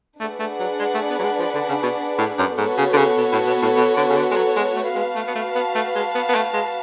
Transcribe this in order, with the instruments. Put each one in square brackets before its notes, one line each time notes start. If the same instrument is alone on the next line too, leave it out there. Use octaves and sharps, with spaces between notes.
[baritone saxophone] A3 [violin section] D4 G#4 B4 D5 F#5
[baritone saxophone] A3
F#3
G#3
A3
B3
F#3
G#3
F3
D3
C#3
B2
A2
F#2
[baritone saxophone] G#2 [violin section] B3 F#4 A4 C#5
[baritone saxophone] C#3
D3
C#3
B2
A2
B2
A2
B2
D3
C#3
D3
G#3
F#3
G#3
A3
[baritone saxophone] G#3 [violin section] F#4 B4 F5 A5
[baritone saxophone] A3
B3
A3
B3
A3
G#3
B3
B3
A3
G#3